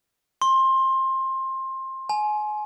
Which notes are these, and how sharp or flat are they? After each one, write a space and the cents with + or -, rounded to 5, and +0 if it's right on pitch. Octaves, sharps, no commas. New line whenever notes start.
C6 +20
G#5 +25